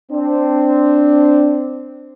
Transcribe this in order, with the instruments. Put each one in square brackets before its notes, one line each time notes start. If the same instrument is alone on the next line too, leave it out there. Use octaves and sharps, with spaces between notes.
[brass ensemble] C4 D4